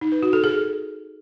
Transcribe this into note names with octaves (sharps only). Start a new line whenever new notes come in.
D#4
B4
F#4
A4
G#4